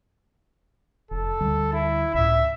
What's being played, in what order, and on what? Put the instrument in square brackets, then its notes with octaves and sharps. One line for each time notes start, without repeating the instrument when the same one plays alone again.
[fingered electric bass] F1 [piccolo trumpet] A4
[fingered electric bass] D2 G3
[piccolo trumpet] E4
[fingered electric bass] C#2 A2 [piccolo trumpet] E5